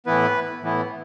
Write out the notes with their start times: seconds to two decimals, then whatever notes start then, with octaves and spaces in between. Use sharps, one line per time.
0.06 A2 E3 B3 E4 B4
0.62 A2 E3 B3 E4